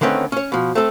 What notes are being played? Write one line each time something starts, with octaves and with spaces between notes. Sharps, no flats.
D3 D#3 A3 C4 C#4 B4
C#4 C#5
B2 F3
A3 C4 A4